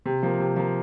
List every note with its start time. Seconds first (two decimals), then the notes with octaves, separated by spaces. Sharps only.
0.06 C3
0.23 F3 A#3
0.40 C3
0.56 F3 A#3